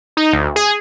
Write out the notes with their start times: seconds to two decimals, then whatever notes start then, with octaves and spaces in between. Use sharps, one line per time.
0.17 D#4
0.33 D2
0.56 G#4